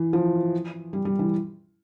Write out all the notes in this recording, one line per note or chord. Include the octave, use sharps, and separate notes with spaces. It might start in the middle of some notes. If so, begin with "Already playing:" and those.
Already playing: E3
F3
G3
G3
E3